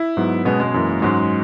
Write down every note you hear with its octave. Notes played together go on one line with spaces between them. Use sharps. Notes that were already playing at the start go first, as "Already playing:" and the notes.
Already playing: E4
G#2 F#3 B3
B2 G#3 B3 C#4 G#4
G#3
F#2 E3 A#3
G#2 F#3 G#3 C#4 F#4